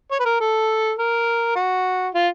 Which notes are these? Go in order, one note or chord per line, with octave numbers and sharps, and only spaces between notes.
C#5
B4
A#4
A4
A#4
F#4
F4